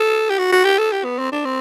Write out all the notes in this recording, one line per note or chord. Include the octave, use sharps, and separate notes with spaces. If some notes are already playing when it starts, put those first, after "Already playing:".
Already playing: A4
G4
F#4
F#4
G4
A4
G4
B3
C4
D4
C4